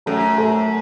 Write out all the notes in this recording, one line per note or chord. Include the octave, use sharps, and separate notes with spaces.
F#2 A3
A3